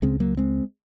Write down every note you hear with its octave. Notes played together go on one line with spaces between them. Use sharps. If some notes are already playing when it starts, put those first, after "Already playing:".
C#2 C#3 G#3 C4
F#3 A#3
G#3 C4